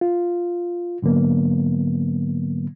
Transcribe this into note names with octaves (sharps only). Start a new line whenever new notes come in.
F4
G#2 D3 F#3 A#3 B3